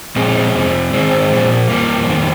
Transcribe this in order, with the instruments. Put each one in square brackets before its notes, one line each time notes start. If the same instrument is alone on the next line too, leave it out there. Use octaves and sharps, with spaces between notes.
[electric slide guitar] A#2 F3 G#3 C4
F2 C3 F3
G#2 D#3 G#3 C4
A#2 F3
F2 D3 F3 G3 A#3
F2 D#3